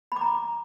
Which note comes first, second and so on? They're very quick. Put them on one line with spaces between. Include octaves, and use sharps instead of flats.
B5 D6 A#5